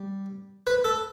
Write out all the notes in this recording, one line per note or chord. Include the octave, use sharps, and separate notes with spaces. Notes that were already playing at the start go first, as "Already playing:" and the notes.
Already playing: G3
B4
A4